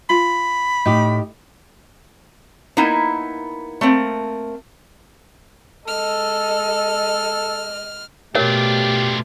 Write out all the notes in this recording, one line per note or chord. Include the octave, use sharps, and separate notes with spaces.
F4 B5
A2 D#4 G4
A#3 B3 D#4 E4
A3 A#3 C4
G#3 A4 D#5 F6
B2 A3 D4 F4 G4 A#4 C#5